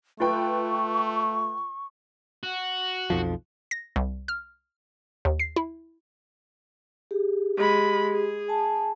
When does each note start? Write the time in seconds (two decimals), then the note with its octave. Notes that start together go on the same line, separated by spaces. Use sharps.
0.20 A3 F4 B4 G5 C#6
2.43 F#4
3.10 B1 F2 F3
3.71 A#6
3.96 C2
4.28 F6
5.25 D#2
5.39 C7
5.56 E4
7.11 G4 G#4
7.57 G#3 G4 B5
8.11 G#4
8.48 G#5 A5